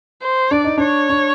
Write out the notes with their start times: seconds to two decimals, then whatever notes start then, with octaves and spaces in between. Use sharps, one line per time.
0.22 C5
0.51 D4 D5
0.64 D#4
0.78 D4 C#5
1.09 D4